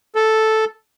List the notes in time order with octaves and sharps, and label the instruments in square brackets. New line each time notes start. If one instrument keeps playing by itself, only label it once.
[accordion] A4